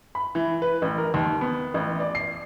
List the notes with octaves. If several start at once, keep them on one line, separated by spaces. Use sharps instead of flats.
B5
E3
B4
A1
A#4
D#2
B3
A1
D5
C7